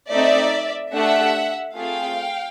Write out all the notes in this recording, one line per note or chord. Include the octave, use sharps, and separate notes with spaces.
A3 C4 D#4 D5 E5
A3 D4 G4 E5 F#5
A3 C4 F4 G#4 F5 G5